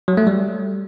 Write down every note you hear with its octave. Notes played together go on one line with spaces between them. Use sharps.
F#3
A3
G3